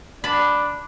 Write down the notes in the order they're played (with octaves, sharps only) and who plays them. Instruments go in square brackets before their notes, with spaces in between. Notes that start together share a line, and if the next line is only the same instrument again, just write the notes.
[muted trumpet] D4 [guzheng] A5 B5